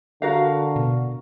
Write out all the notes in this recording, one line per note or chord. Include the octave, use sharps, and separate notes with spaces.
D3 F#4 A#4 F5
B2